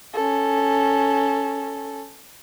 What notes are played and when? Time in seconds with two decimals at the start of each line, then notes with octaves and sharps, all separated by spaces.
0.14 C#4 A4